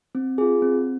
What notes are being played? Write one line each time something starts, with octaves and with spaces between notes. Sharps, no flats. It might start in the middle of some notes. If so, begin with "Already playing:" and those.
C4
F4 G#4
C4